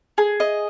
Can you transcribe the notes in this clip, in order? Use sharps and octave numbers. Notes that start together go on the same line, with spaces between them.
G#4
D#5